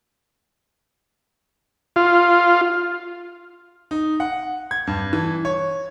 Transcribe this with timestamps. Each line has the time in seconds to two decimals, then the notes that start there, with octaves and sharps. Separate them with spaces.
1.96 F4
3.91 D#4
4.20 F#5
4.71 G#6
4.87 G2
5.13 E3
5.45 C#5